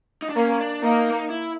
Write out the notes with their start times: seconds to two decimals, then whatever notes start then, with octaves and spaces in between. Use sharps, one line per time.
0.22 D#4
0.29 D4
0.36 A#3 C#4
0.60 D4
0.83 A#3 D#4
1.30 E4